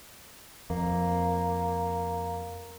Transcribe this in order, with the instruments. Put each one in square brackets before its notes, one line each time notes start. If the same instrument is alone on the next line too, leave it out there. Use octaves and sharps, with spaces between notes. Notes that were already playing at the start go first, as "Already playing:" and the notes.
[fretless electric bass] F2 [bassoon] A#3